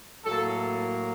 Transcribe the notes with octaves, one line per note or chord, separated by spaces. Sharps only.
A2 F#3 A#3 A4